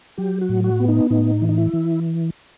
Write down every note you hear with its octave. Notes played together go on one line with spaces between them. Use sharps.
F#3 G4
F#4
A2
F#4
B3
D#4
A2 D#4
E3
D#4
E4
E3